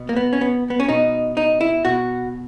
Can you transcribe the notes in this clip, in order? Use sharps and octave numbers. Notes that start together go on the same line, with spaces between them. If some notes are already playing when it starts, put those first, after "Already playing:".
Already playing: B2
A#3
B3
C#4
B3
B3
C#4
B2 D#4
D#4
E4
B2 F#4